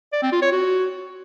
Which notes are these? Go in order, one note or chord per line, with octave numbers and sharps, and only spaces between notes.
D5
C4
F4
C#5
F#4